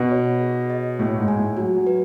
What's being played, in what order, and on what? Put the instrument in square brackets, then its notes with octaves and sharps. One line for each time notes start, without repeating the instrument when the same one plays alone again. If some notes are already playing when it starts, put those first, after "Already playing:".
Already playing: [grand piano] B2 [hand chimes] D#4
[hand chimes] C#5
G#4
D#5
[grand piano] A2 [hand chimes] G#4
[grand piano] G#2
[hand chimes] G#5
[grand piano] A2
[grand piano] F#3 [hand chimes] F#4
[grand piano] F#3
[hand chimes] B4